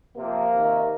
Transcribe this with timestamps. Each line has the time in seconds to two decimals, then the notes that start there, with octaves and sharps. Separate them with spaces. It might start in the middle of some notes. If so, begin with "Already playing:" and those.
0.16 C3 F3 A#3
0.52 C3 D#3